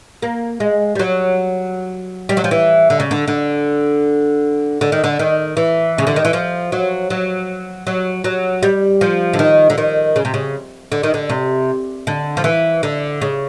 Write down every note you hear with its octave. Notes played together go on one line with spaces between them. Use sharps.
A#3
G#3
G3
F#3
G3
F#3
F3
E3
D3
C#3
D3
D3
D3
D#3
D3
D#3
E3
C#3
D3
D#3
E3
F3
F#3
F#3
F#3
F#3
G3
F3
D3
D#3
D3
D#3
C#3
C3
C#3
D3
D#3
D3
C3
D3
F3
E3
D3
C#3